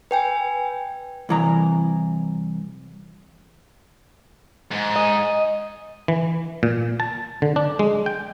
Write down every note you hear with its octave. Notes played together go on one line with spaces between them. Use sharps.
B4 G5 G#5
C2 E3 A#5
G#2
D#5
E3
A#2
A5
D3
D4
G#3
G5